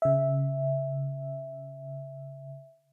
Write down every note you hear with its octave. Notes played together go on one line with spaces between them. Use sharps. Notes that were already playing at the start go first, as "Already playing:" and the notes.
C#3 E5